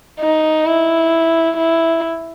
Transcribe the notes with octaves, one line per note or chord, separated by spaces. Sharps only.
D#4
E4
E4